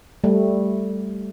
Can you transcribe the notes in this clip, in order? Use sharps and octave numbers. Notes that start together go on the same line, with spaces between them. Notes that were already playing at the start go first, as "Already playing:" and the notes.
G3 A3